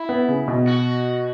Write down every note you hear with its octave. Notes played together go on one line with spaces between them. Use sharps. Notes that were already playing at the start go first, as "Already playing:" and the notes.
Already playing: E4
B3
C#3
B2
F#4